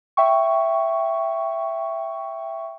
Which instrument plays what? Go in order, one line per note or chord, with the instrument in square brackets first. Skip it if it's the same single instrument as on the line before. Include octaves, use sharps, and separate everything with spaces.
[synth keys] E5 G5 C#6